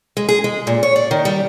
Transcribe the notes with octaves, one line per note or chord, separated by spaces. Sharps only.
G#3
G#4
G#3
A#2
C#5
D5
D#3
G3